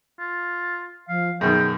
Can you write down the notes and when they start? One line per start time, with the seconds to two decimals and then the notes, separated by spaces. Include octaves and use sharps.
0.19 F4
1.09 F3 F5
1.41 F#2 B2 D#3 G#4 G5